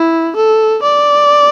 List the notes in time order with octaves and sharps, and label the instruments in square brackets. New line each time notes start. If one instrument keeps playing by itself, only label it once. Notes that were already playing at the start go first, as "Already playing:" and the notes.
Already playing: [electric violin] E4
A4
D5